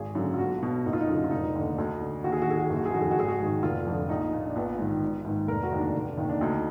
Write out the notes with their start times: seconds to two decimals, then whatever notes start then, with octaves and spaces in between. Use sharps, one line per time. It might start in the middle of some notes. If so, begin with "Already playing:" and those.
Already playing: G#1 G#4
0.15 F#2 D3
0.34 F4
0.38 B1 F#4
0.62 B2
0.85 F#1 D#4
0.93 F4
1.01 D#4
1.08 F#2 D3
1.24 F4
1.31 F1 D#4
1.55 D#2 D3
1.78 D2
2.01 D3
2.24 D#2 F#4
2.32 G#4
2.42 F#4
2.47 D#3 G#4
2.59 F#4
2.67 F#1 G#4
2.76 F#4
2.85 G#4
2.94 F2 D#3 F#4
3.02 G#4
3.11 F#4
3.17 G#1 G#4
3.28 F#4
3.39 G#2 D#3
3.62 F1 F4
3.87 F2 D3
4.09 A#1 D#4
4.33 A#2
4.45 D4
4.56 A#1 B3
4.78 G#2 D#3
5.02 G#1
5.25 G#2 D#3
5.48 F1 A#4
5.63 F#4
5.72 D#2 D#3
5.79 D4
5.94 F1
6.17 D#2 D#3
6.29 D4
6.41 D2 D#4